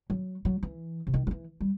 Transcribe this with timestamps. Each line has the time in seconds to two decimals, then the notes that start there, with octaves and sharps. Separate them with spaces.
0.10 F#3
0.45 F#3
0.63 E3
1.07 C3
1.14 D#3
1.27 F#3
1.31 E3
1.61 G3